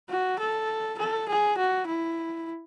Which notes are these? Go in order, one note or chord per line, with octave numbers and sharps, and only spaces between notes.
F#4
A4
A4
G#4
F#4
E4